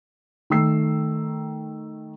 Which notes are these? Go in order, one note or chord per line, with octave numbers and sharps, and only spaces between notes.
D#3 A3 E6 C7